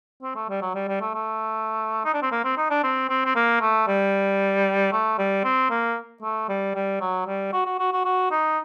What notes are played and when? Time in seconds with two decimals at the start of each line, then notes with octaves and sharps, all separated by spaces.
0.23 C4
0.36 A3
0.49 G3
0.62 F#3
0.75 G3
0.89 G3
1.01 A3
1.14 A3
2.05 D#4
2.14 D4
2.22 C4
2.32 A#3
2.44 C4
2.58 D#4
2.70 D4
2.83 C4
3.09 C4
3.25 C4
3.36 A#3
3.61 A3
3.88 G3
4.92 A3
5.18 G3
5.44 C4
5.70 A#3
6.23 A3
6.49 G3
6.75 G3
7.01 F#3
7.27 G3
7.53 F#4
7.66 F#4
7.79 F#4
7.93 F#4
8.05 F#4
8.31 D#4